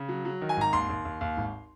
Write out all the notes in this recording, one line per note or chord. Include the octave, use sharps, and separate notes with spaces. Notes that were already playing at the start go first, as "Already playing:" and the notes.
Already playing: C#3
F#3
F#3
D#3
G#5
G#1 A#5
D#2 C6
D#2
D#2
D#2
G#1